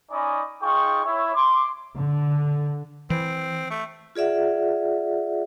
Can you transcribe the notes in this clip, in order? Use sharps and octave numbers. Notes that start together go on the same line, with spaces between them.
C#4 D#4 D5 D#5 G#5 B5
D#4 F4 G#4 G5 C#6
E4 C#5 E5
C6 D6
D3
E3 C4
A3
F4 G#4 D5 E5 F#5